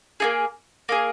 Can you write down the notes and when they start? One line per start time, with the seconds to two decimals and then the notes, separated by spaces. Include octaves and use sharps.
0.20 A#3 D#4 G#4
0.89 A#3 D#4 G#4